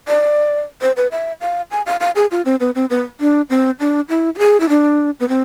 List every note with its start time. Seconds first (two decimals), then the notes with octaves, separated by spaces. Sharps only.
0.08 D5
0.81 C5
0.97 B4
1.11 E5
1.41 F5
1.71 G#5
1.86 F5
2.00 F5
2.16 G#4
2.31 F4
2.45 C4
2.60 B3
2.75 C4
2.90 B3
3.21 D4
3.50 C4
3.80 D4
4.09 E4
4.35 F4
4.39 G#4
4.60 E4
4.69 D4
5.20 B3
5.28 C4